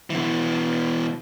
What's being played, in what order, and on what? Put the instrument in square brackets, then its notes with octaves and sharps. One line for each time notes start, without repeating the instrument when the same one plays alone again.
[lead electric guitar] B2 E3